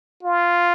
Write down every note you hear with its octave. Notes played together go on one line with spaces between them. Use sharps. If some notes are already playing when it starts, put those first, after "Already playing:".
F4